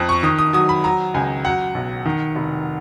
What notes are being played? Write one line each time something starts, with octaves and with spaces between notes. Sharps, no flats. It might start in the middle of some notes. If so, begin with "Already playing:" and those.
Already playing: F2 F#6
C#6
D#3 D#6
D#6
F#3 D#6
B5
F#3 A#5
C#2 G#5
F#3 F#5
B1
D#3
F1